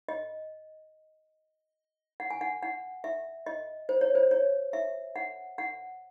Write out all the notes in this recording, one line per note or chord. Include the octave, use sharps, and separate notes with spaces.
D#5
F#5
G#5
F#5
F#5
E5
D#5
C5
C#5
C5
C#5
E5
F#5
F#5